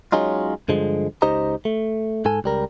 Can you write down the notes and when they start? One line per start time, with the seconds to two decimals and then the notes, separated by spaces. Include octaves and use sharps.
0.12 F#3 G#3 C#4 D#4 F4
0.68 G2 D3 F3 G#3
1.22 C#2 D#4 G4 C5 D#5 A#5
1.65 A3
2.25 G#2 A4 G#5
2.44 C#2 G3 A#4